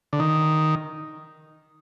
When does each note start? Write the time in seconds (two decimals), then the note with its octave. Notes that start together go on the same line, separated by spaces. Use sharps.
0.13 D3
0.19 D#3